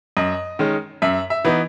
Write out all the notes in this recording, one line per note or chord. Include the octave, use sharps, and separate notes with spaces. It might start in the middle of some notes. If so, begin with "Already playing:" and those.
F#2 D#5
D#3 G#3 C#4
F#2 E5
E5
E3 B3 D#4